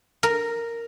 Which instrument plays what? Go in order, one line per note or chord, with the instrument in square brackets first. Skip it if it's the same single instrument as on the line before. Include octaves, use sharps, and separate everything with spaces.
[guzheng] A#4